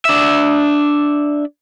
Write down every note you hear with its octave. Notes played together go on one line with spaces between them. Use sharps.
D4 E5